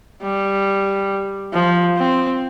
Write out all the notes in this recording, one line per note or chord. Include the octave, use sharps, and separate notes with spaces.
G3
F3
C4